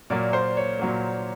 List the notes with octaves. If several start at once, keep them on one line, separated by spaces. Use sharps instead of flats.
A#2 F#3 A#3 D5
C5
C#5
A#2 F#3 A#3